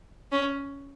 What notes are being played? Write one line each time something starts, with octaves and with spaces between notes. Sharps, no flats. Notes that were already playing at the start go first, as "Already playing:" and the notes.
C#4